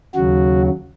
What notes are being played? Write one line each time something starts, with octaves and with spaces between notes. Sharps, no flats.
D#2 C#3 F#3 F#4